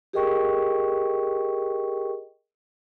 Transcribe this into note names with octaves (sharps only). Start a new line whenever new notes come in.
G4 G#4 A#4 D#5 G5 C#6